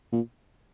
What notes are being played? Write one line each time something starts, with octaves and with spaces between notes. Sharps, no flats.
A#2